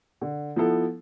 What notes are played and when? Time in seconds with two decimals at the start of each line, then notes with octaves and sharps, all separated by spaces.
0.21 D3
0.56 F3 B3 E4 A4